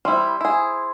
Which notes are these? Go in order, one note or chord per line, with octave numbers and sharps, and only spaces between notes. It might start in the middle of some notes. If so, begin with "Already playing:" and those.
G3 E4 C5
E4 G#4